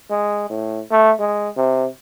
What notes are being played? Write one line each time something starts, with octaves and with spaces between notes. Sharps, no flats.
G#3
A2
A3
G#3
C3